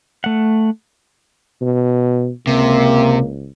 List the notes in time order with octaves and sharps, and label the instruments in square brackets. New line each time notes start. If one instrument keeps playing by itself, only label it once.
[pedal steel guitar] A3 F#5
[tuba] B2
[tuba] C#2 [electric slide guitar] C3 [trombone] A#3